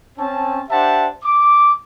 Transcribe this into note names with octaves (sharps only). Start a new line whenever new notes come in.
C4 C#4 A5
D4 G4 C5 E5 F#5 A5
D6